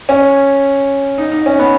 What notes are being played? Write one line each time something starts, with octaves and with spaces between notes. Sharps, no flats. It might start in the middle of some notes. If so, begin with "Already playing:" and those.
C#4
D#4
D#4
C#4
B3